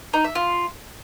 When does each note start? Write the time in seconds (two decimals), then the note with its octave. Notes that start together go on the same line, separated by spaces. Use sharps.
0.14 D#4
0.24 E5
0.35 F4